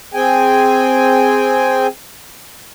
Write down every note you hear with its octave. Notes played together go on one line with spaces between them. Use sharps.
C4 G#4 G5 G#5